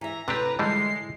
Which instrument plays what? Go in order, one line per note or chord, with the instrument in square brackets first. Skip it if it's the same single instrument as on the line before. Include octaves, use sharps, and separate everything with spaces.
[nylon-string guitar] E3 E5 [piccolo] A#5
[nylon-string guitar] A2 [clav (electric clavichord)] C3 D4 G4 [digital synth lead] B4
[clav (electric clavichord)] D3 E3 G3 [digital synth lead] G#3 [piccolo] C7